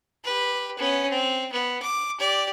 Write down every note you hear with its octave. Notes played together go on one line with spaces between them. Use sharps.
G4 B4
B3 C#4
C4
B3
D6
G4 D5